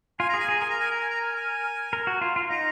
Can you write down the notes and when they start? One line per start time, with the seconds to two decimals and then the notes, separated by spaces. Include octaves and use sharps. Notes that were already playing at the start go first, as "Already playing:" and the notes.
0.19 F4 G#5
0.29 G#4 A#5
0.39 G#5
0.49 G#4 A#5
0.60 A#4 G#5
0.70 A#5
0.80 G#5
0.91 A#5
1.00 G#5
1.10 A#5
1.21 G#5
1.35 G#5
1.93 A#4
2.07 F#4
2.21 F4
2.36 F4
2.50 D#4 A#5